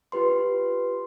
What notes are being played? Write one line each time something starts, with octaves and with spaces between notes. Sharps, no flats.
F4 G4 B4 C6